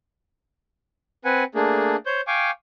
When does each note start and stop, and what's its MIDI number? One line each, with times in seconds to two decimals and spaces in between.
1.25 1.44 60
1.25 1.44 71
1.25 1.44 78
1.25 1.44 80
1.55 1.96 57
1.55 1.96 58
1.55 1.96 62
1.55 1.96 68
2.06 2.21 72
2.06 2.21 73
2.06 2.21 91
2.27 2.51 77
2.27 2.51 79
2.27 2.51 80
2.27 2.51 85
2.27 2.51 86